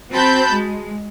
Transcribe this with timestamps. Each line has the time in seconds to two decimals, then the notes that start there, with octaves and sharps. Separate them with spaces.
0.11 C4 F#4 A5 B5 G6
0.52 G#3